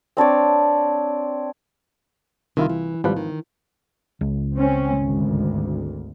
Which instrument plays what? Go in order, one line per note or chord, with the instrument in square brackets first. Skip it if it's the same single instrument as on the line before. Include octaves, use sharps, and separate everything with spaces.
[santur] C4 D4 C#5 D5
[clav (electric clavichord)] C2 E4 F4 [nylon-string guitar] D#3
[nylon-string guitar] E3
[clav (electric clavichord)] G#1 F3 B4 [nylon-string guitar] G3
[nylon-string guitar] D#3
[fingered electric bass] C#2
[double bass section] C4 C#4
G#1 D2